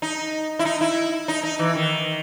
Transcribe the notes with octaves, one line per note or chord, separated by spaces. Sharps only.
D#4
E4
D#4
E4
D#4
D#4
E3
D#3